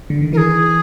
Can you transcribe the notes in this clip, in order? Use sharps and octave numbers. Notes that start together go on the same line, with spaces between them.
D3
D#3
E3 G#4 A#4